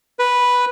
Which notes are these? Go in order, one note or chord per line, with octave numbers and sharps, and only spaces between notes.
B4